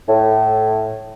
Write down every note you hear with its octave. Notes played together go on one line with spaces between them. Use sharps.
A2